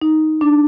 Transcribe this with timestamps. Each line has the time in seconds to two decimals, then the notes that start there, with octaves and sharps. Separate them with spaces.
0.01 D#4
0.41 D4